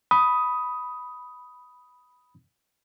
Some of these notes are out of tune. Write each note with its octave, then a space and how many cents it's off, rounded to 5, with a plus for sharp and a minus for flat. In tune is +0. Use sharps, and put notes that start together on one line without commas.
B5 +0 D#6 +10